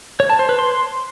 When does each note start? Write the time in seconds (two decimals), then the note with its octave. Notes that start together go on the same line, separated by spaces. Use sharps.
0.20 C#5
0.30 A5
0.39 C5
0.49 B4
0.59 C6